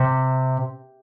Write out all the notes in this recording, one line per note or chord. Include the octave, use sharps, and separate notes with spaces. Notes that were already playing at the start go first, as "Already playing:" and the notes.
Already playing: C3